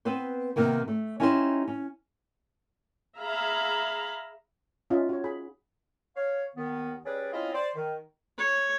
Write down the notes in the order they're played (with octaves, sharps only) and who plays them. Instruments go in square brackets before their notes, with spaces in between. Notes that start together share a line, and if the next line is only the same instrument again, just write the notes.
[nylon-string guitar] B3 C4 B4 C5
C3 D#3 A#3 B3
A3
C#4 D#4 E4 G4 B4 C5
C#4
[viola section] G#4 E5 F5 A#5 B5
[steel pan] C#4 D#4 F4 D#5 E5
F#4 C#5
G#4 B5
[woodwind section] C#5 F5
D#2 D#3 B3
G3 C#4 G#4 B4 D5
C4 C#4 E4 F4 D#5 F5
C5 D5
D#3
[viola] C#5